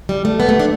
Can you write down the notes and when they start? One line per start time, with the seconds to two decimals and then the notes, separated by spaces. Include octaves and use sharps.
0.09 G3
0.25 A3
0.40 B3
0.49 A3
0.59 D4